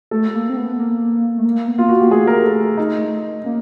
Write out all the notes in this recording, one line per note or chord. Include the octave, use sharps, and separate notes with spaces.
A3 A4
A#3
C4
B3
A#3
A3
A#3
B3
A#3 F4
F#4
A#3 G4
A3 G#4
A#4
A4
D#4
A#3 C#4